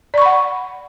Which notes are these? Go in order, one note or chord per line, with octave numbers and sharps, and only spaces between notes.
D5 F#5 B5 C#6